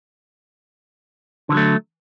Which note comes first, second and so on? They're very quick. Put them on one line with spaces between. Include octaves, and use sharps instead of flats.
D3 E3 F#3 A3